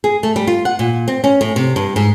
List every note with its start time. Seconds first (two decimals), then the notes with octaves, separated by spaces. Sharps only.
0.04 G#4
0.23 A3
0.36 G3
0.47 F4
0.65 F#5
0.79 A#2
1.08 C4
1.24 C#4
1.41 A2
1.56 C3
1.76 G2
1.96 G#2